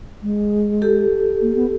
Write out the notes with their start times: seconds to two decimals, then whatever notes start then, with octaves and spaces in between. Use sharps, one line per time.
0.22 G#3
0.82 G4 A4
1.42 A#3
1.56 B3